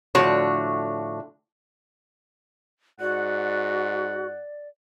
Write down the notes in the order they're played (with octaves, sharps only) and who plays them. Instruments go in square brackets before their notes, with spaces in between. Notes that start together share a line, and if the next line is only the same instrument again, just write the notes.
[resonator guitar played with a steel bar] A2 D3 F3 A3 F#4 C#5
[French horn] G#2 [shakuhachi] F#4 [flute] D5 [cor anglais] F#5